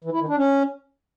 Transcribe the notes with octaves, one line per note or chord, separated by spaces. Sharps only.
E3
E4
D#3
D4
C#4